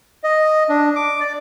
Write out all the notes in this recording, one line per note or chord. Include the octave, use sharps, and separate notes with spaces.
D#5
D4
D6
D5